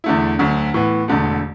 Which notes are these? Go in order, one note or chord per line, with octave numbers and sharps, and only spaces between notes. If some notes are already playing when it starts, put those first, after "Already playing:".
E2 D3 A3 E4
D2 D3 F#3
A2 E3 B3
E1 E2 D3 A3